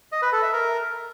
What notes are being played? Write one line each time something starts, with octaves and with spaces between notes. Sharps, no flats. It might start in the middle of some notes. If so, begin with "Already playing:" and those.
D#5
B4
A4
E5
A#4